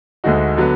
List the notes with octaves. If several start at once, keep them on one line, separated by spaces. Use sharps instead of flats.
D2 D3 G#3 D#4 F#4
D3 F#3 B3